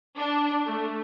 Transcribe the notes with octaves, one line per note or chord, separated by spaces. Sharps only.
D4
A3